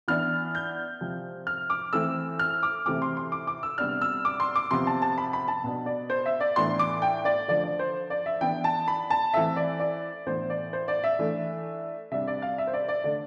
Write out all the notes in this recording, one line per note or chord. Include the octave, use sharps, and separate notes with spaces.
E3 B3 D4 F6
G6
C3 F3 C4
F6
D6
E3 A3 C4 E6
F6
D6
C3 E3 A3 C4 D6
C6
C6
D6
D6
E6
C3 G3 B3 D4 F6
E6
D6
C6
D6
C3 F3 B3 C6
A5
A5
B5
B5
A5
B2 B3 D4
D5
C5
E5
D5
A2 E3 B3 D4 C6
D6
G5
D5
D3 F3 A3 D5
D5
C5
D5
E5
E3 B3 D4 G5
A5
B5
A5
E3 A3 C4 E5
D5
D5
A2 E3 B3 D4 C5
D5
C5
D5
E5
E3 A3 D4
C3 G3 D4 E5
D5
F5
E5
C5
D5
D5
D3 A3 D4 D5